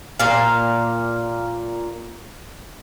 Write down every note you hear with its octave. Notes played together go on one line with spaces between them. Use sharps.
A#2 F5